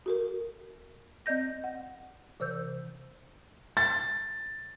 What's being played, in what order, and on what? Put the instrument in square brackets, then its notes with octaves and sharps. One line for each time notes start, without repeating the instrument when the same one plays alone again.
[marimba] F#4 A4 A#4
C4 D5 D#5 G6 A#6
F#5
C3 E3 C5 E6 G6
[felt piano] A6